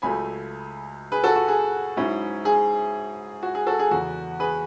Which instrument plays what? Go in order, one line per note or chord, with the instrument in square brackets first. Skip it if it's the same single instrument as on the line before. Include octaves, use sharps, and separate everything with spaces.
[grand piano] C#2 C#3 F#3 A3 G#5 B5
G#4 B4
F#4 A4
F#4
G#4
G#2 F#3 C#4 E4
G#4
F#4
G#4
F#4 A4
G#4
E2 C#3 F#3 F#4
G#4 B4